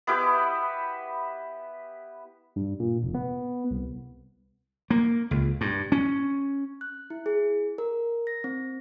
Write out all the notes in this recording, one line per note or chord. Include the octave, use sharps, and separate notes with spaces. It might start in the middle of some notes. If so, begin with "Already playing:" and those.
B3 E4 G4 B4
G2
A#2
F1
B3
C2
A#3
C#2
G2
C#4
F#6
E4
G#4
A#4
A#6
C4